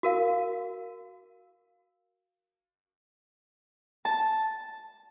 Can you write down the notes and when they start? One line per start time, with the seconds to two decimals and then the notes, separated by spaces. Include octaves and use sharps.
0.03 F#4 A#4 F5
4.05 A5